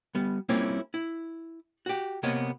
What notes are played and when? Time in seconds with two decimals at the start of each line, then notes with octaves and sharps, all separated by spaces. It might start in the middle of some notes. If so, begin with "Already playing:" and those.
0.15 G3 B3
0.49 G3 A#3 C4 C#4 E4 F4
0.94 E4
1.86 F#4 G4
2.23 C3 A#3 B3 C#5 D#5